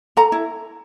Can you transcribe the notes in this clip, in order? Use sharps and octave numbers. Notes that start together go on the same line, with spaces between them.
A4 A#5
E4